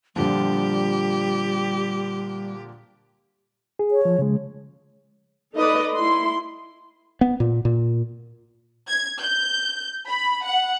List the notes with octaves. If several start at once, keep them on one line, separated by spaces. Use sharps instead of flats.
A#2 D3 F3 G3 G4
G#4
C#5
F3
C#3 G#3
D#4 A4 B4 D5 D#5
E4 C6
B3
A#2
A#2
G#6
G6
B5
F#5